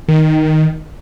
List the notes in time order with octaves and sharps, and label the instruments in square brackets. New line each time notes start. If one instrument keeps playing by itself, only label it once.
[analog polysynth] D#3